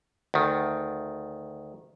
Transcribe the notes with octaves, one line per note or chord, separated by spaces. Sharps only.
D2 D#3